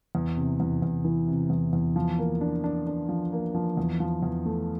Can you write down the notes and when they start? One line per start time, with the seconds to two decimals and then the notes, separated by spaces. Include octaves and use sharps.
0.15 E2
0.37 C3
0.60 E2
0.82 E2
1.05 E3
1.27 C3
1.50 E2
1.73 E2
1.96 F3
2.19 A#3
2.41 D4
2.64 D4
2.87 D4
3.09 F3
3.32 A#3
3.55 F3
3.77 E2
4.00 F3
4.23 E2
4.45 A3